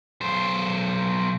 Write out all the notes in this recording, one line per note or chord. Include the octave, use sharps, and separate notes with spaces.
B1 C5